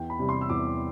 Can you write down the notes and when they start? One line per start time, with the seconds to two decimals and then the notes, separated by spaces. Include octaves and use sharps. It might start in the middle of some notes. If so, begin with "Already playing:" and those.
Already playing: E2 G5
0.10 B5
0.19 C3 G3
0.29 C6
0.41 E6
0.49 E2 D6